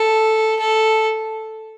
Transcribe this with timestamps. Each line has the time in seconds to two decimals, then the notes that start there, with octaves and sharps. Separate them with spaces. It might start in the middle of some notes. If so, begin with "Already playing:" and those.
Already playing: A4
0.60 A4